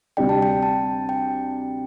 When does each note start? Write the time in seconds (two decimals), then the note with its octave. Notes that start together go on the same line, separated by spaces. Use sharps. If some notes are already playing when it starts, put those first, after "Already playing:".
0.17 D2 C3 G3 D4 G5
0.29 A5
0.42 G5
0.63 A5
1.09 G5